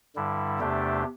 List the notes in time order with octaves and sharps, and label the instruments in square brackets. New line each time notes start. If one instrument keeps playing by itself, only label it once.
[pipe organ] G2 D3 G3 E4
E2 C3 A3 D4 G4